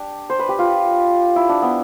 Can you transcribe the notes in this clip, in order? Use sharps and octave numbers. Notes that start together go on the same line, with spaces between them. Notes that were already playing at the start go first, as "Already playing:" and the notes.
Already playing: D4 G4
C5
B4
G4
F4
E4
D4
B3